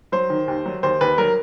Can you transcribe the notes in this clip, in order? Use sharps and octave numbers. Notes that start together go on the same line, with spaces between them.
F#3 C5
D#3
D#2
F#3
D#2 C5
D#2 B4
F#3 A#4